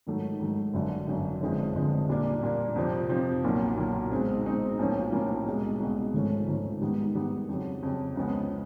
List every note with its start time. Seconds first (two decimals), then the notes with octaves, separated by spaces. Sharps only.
0.07 G#2 D#3 F#3 A3
0.40 G#2 D#3 F#3 A3
0.73 G1 F#2 D3
1.08 G1 F#2 D3
1.41 G1 F2 D3 F3 G#3
1.75 G1 F2 D3 F3 G#3
2.09 A#2 G3 A#3 D4
2.43 A#2 G3 A#3 D4
2.76 F2 C3 F3
3.09 F2 C3 F3
3.43 B1 A#2 F#3 A#3
3.77 B1 A#2 F#3 A#3
4.11 B2 G#3 C4 D#4
4.45 B2 G#3 C4 D#4
4.79 B1 A2 F3 A#3 C#4
5.12 B1 A2 F3 A#3 C#4
5.46 C2 B2 G#3
5.80 C2 B2 G#3
6.13 G#1 G#2 F3 A3 C#4
6.48 G#1 G#2 F3 A3 C#4
6.82 G#2 D#3 G3 B3
7.15 G#2 D#3 G3 B3
7.49 F2 C#3 F#3
7.82 F2 C#3 F#3
8.16 C#2 C#3 F3 G#3 B3